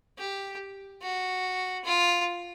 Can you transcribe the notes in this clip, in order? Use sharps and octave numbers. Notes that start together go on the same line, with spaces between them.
G4
F#4
F4